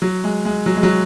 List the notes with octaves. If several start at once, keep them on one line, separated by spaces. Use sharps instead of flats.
F#3
G#3
G#3
F#3
G#3
F#3